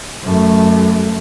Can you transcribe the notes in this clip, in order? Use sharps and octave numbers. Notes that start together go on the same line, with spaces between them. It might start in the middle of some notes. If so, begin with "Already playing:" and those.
F#2 A3